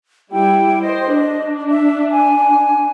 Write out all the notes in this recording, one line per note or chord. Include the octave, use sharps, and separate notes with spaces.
G3 E4 G5
C5 D#5
D4
E5
G#5